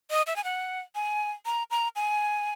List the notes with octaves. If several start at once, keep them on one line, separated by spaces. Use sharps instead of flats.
D#5
E5
G#5
F#5
G#5
A#5
A#5
G#5